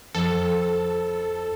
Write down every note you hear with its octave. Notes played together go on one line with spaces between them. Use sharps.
F2 A4